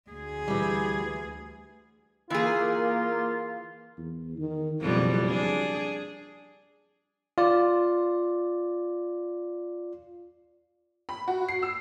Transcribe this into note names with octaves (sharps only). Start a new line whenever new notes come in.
D2 G#4
E3 G3
E3 A#3 F4 G#4
E2
D#3
F#1 F2 B2 G3
D4 G#4
F4 D5
B5
F#4
C7
E6